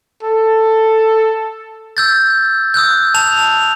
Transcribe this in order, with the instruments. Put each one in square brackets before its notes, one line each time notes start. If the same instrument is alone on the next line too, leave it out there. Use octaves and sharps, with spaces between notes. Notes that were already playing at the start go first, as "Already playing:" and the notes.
[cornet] A4
[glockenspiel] E6 G6 A6
D#6 E6 F#6 G6
A5 F7